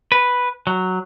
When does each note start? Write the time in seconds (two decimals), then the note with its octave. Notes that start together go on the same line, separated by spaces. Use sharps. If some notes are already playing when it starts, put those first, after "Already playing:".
0.12 B4
0.67 F#3